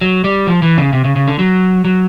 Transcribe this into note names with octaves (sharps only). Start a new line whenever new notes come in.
F#3
G3
F3
E3
C#3
C3
C#3
C#3
D3
F#3
F#3